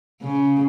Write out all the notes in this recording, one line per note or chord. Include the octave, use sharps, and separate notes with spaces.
C#3